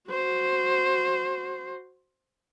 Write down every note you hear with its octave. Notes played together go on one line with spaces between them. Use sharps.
F#4 C5